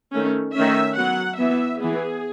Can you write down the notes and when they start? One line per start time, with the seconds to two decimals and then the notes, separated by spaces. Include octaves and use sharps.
0.13 D#3 A3 C#4
0.55 D#3 A3 C#4 E5
0.97 F#3 B3 F#5
1.39 E3 B3 E5
1.81 E3 B3 G#4